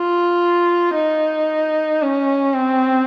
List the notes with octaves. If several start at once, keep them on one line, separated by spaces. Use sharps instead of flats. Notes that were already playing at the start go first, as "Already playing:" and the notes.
Already playing: F4
D#4
C#4
C4